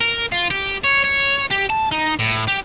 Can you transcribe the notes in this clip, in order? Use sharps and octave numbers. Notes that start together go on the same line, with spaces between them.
A#4
F4
G4
C#5
C#5
G4
A5
D#4
A2
G4